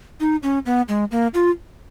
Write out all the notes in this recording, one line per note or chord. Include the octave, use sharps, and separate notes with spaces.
D#4
C#4
B3
G#3
A#3
F4